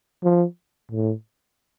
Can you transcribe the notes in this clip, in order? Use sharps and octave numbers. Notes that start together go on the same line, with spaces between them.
F3
A2